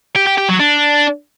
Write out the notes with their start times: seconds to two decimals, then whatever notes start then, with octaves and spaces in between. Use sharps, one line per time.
0.16 G4
0.27 G4
0.38 G4
0.49 F#3
0.60 D4